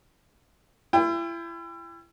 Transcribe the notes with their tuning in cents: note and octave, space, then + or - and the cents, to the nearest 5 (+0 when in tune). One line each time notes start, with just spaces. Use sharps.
E4 +35 G5 +35